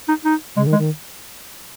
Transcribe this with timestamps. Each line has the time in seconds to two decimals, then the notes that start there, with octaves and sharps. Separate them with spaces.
0.08 D#4
0.25 D#4
0.56 C#3 G#3
0.67 D#3
0.73 G#3
0.79 D#3